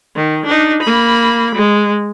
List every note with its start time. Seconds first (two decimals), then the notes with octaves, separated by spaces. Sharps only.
0.16 D#3
0.46 D4 D#4
0.82 A#3 B5
1.55 G#3